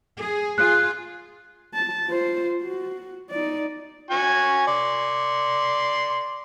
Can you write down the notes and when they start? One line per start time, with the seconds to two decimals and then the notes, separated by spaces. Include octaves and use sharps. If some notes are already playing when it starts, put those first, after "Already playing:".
0.19 G#4
0.58 F4 G#4 F#6
1.74 A5
2.07 F4 C5
2.62 F#4
3.30 D#4 D5
4.10 F#4 G#5 C#6
4.68 D5 C6